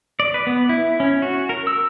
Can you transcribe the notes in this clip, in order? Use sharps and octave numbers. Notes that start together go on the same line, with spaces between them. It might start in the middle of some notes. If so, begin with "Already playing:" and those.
D5
B4
B3
E4
C#4
F#4
A#4
E6